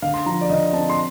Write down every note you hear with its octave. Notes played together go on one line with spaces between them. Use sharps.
D3 F5
C6
F3 A#5
D5
D3 D#5
C4 A5
C6